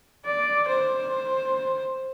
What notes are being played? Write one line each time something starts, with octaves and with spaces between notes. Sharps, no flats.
D5
C5